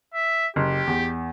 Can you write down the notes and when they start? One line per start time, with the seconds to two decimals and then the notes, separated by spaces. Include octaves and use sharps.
0.14 E5
0.56 F#1 G4
0.87 E2